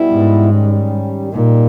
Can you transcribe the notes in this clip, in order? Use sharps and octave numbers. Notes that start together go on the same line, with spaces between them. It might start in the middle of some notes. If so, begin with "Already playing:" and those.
Already playing: B2 G3 B3 E4
G#2
D#3 G3 C#4
A#2 G3 A#3 D#4